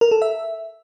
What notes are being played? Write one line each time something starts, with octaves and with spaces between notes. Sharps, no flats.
A#4
A4
E5